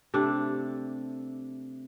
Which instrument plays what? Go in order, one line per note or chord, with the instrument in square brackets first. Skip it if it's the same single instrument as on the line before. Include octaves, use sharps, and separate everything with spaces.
[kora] C3 A3 D4